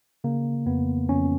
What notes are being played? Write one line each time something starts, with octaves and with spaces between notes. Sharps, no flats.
C#3 A#3
F2 B3
F2 C#4